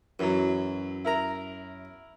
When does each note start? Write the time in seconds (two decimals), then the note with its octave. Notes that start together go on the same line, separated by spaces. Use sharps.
0.19 F#2 E3 F#3
1.05 E4 A#4 A#5